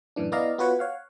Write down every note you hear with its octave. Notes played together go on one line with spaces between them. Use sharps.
F#2 A2 E3 D4
B3 E4 D5 D#5 F5 A#5
B3 F4 F#4 B4 C#5 F#5
C#5 F5 F#5